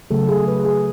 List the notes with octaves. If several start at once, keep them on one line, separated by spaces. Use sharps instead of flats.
C#3 F#3 A3 A4
G#4
B4
G#4